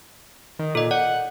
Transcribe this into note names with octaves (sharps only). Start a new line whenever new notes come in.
D#3
A#2 A4 D#5
D5 F#5